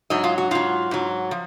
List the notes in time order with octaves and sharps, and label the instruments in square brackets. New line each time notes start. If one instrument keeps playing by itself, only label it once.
[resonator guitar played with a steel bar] G#2 F#3 D#5
F4
F#4
G#2 F#3 F4
G#2 F#3
F3